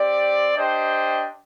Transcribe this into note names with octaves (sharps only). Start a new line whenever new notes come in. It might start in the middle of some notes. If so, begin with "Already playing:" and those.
Already playing: C4 G4 D5
D4 G4 C5 D#5 G5